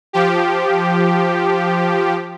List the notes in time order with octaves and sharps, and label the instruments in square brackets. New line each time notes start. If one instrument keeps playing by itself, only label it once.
[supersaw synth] F3 G4